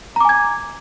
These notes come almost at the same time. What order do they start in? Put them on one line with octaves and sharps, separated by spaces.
A#5 D6 G#5 G#6